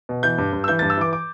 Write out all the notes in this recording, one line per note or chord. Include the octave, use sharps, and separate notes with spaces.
B2
E3 G6
G2
G2
E6
E3 G6
A6
G2
E6
E3 D6
D6